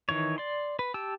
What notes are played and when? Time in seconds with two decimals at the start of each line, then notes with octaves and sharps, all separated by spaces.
0.09 D#3 E3 C#5
0.38 D5 C6
0.79 B4
0.94 G4 A5 E6